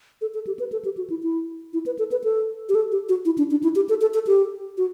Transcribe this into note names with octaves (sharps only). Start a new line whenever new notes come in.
A4
A4
G4
B4
A4
G4
F#4
E4
E4
E4
B4
A4
B4
A4
G4
A4
G4
F#4
E4
D4
D4
E4
G4
A4
A4
A4
G4
F#4